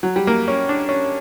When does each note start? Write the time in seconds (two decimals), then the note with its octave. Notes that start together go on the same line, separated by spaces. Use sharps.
0.03 F#3
0.16 G3
0.27 A#3
0.48 C#4
0.69 D4
0.89 C#4